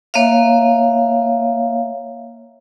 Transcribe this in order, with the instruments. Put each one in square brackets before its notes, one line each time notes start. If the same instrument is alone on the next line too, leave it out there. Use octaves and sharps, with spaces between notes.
[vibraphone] A#3 C#5 E5 F5